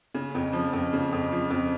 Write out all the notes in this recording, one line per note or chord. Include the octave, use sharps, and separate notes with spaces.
C#3
F2
F3
F2
C#3
F2
F3
F2